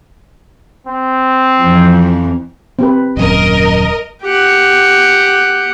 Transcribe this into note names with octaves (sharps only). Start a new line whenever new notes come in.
C4
F2 E3 F3
C4 G4 B4
D#1 F#2 A#4 D#5
G4 F#5